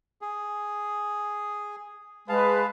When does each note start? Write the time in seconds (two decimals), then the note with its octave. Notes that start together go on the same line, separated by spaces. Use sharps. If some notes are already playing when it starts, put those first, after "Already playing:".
0.22 G#4
2.29 G#3 G#4 B4 F5 A5